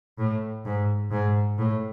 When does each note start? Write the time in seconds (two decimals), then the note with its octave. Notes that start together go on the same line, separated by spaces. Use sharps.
0.19 A2
0.65 G#2
1.11 G#2
1.58 A2